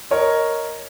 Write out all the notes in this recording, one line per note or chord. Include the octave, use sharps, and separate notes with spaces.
A#4 C#5 D#5